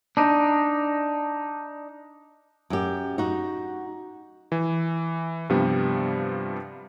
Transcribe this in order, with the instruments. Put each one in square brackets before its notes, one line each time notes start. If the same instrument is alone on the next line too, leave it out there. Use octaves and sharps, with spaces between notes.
[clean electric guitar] D4 D#4
[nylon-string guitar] F#2 G4
D#4 F#4
[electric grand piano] E3
G2 C3 F3 G3 B3